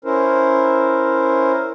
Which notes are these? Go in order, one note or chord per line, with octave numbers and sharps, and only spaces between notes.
C#4 E4 A#4 C5